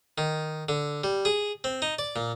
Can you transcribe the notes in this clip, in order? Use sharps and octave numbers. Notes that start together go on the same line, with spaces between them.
D#3
D3
G3
G#4
C4
D#4
D5
A#2